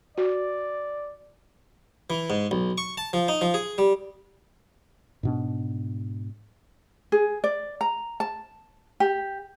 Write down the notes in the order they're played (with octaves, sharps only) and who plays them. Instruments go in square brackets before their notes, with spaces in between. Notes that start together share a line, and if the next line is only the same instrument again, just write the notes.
[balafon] F#4 [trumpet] D5
[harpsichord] E3
G#2
B1
C#6
A5
F3
D#4
F3
G#4
G3
[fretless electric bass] G#2 B2 D4
[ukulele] G#4
D5
A#5
A5
G4